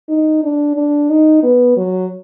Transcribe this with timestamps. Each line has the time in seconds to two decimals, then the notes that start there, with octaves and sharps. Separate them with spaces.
0.09 D#4
0.43 D4
0.77 D4
1.10 D#4
1.43 B3
1.77 F#3